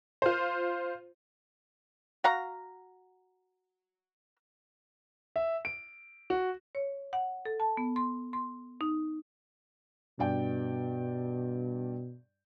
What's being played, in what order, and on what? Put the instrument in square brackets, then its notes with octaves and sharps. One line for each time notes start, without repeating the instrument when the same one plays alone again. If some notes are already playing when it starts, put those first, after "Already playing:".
[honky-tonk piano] F4 C5
[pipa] F#4 F5 A#5
[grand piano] E5
D7
F#4
[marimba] C#5
F#5
A4
A5
B3
C6
C6
D#4
[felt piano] G2 D5 G5 [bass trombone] B2